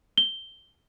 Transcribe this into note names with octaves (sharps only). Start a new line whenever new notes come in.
G7